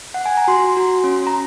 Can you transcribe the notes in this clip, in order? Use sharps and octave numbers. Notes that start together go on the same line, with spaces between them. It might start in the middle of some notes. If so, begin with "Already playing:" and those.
F#5
G#5
A#5
F#4 C6
F#4
C#4
A#5